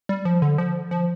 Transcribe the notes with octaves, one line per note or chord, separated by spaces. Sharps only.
G3
F3
D3
F3
F3